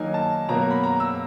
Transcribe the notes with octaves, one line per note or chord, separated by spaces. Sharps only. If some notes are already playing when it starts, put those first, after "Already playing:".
Already playing: D#3 F#3 A#3 D#4 G#5
A5
B2 F#3 A#3 A#5
B5
A#5
E6